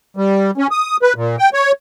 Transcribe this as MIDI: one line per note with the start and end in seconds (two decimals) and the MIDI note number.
0.17 0.51 55
0.57 0.67 61
0.71 0.97 87
1.02 1.13 71
1.16 1.36 46
1.39 1.49 79
1.54 1.72 73